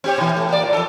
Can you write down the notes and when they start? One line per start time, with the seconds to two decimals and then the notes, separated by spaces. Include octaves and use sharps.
0.04 C4 G4 C#5
0.18 B2 E3
0.36 A3
0.49 A#3 D5
0.62 A#2
0.74 F2 A4